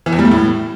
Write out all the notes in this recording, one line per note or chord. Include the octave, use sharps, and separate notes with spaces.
E3
E2
G3
A3
A2